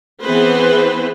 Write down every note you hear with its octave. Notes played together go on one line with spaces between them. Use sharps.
E3 B3 C4 G#4 B4 C5